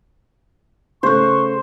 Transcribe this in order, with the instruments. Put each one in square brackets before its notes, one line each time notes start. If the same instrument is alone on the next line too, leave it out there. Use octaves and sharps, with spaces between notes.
[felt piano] C#3 A3 F#6 [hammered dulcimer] C5 [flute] C#6